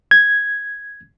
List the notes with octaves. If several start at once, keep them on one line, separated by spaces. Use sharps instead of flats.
G#6